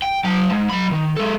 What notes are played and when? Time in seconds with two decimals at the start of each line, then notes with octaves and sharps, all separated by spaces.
0.02 G5
0.24 F#3 A5
0.51 G#2
0.69 F#3 B5
0.91 D#3
1.17 G#3 A4